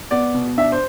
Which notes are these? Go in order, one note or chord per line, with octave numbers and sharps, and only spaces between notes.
B3 D5
B2
D4 E5
C5